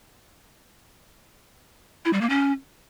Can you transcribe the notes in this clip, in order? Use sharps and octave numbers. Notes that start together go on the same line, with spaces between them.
E4
G3
A#3
C#4